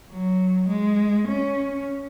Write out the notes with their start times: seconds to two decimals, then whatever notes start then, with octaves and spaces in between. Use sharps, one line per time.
0.10 F#3
0.68 G#3
1.27 C#4